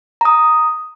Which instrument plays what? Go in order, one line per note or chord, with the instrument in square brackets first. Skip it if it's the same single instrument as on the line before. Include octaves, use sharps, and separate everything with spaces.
[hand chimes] A#5 D#6